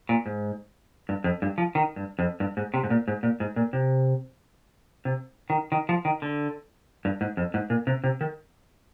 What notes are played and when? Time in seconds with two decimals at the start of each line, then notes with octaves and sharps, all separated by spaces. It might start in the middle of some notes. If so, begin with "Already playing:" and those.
0.09 A#2
0.26 G#2
1.09 G2
1.24 F2
1.42 G2
1.58 F3
1.75 D#3
1.96 G2
2.19 F2
2.40 G2
2.57 G#2
2.74 C3
2.83 G#2
2.90 A#2
3.08 G#2
3.23 A#2
3.40 G#2
3.56 A#2
3.73 C3
5.05 C3
5.50 D#3
5.72 D#3
5.89 F3
6.05 D#3
6.22 D3
7.05 G2
7.21 G#2
7.37 F2
7.54 G#2
7.70 A#2
7.87 C3
8.04 C3
8.21 D#3